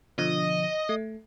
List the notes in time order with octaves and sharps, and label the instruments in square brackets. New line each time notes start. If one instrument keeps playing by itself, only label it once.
[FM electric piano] B2 D3 F3 [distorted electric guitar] D#5
[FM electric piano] A3